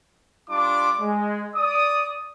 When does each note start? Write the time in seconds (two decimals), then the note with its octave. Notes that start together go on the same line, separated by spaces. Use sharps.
0.49 G3 D4 F4 C6 D6
1.00 G#3
1.56 D5 D#6